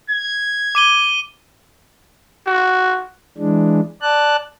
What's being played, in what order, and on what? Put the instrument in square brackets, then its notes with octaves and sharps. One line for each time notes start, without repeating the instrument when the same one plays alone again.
[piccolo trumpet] G#6
[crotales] D6 D#7 G7
[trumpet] F#4
[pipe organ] E3 G#3 D4
D5 A5 F#6